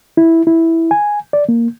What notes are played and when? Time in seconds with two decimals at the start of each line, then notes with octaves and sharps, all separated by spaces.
0.17 E4
0.47 E4
0.91 G#5
1.33 D5
1.49 A#3